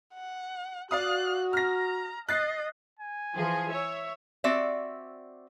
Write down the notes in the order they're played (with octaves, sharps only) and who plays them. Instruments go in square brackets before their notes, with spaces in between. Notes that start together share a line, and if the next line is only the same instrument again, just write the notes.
[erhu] F#5
[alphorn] F#4 [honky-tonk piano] D5 F5 D#6 [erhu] F#6
[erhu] A#5 [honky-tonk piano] F6 A#6
[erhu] D#5 [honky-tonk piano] F#6 A6 C7
[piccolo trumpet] G#5
[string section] E3 F3 G#4
C#5 E5
[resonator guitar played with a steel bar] C4 F#4 D5 E5